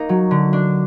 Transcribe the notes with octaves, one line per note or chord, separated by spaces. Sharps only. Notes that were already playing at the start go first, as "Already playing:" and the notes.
Already playing: A#3 D#4
F#3
D3
D4